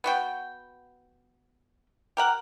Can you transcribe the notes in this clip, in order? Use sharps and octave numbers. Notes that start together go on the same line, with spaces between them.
B3 F#4 G5
G4 A#4 F#5